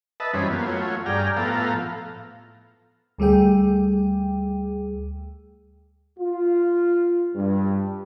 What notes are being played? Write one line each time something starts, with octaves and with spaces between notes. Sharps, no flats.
B4 D#5 E5 A5
F#2 E3 G3 C#4 C5 B5
A#3 B3 F4
F#3 A3 F4 C#5
G2 G#4 D5 G5 A#5 F6
A2 F3 B3 A4 F5 A#5
D2 G3 A3 G#4 G5
F4
G2